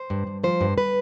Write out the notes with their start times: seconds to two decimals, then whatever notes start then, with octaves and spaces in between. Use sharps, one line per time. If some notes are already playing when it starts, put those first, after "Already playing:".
Already playing: C5
0.10 G2
0.27 G2
0.43 F3 C5
0.61 G2
0.78 B4